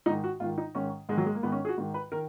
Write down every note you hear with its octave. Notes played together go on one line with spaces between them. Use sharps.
G#2 D#3 D#4
F#4
G#2 D#3 F4
D#4
G#2 D#3 C#4
G#2 D#3 G#3
F#3
G#3
A#3
G#2 D#3 B3
C#4
G#4
F#4
G#2 D#3
B4
D#3 A#4